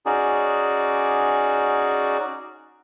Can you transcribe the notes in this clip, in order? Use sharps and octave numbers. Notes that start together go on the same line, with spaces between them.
C#4 D#4 F#4 G#4 D5